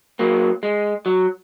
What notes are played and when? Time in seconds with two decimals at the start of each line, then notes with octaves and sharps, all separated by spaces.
0.19 F#3 A#3
0.63 G#3
1.06 F#3